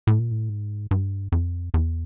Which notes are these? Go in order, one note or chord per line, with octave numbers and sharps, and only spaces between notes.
A2
A#2
A2
G#2
G2
F2
E2